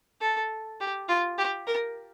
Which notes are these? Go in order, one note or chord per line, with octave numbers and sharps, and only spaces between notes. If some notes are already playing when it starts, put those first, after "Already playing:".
A4
G4
F4
G4
A#4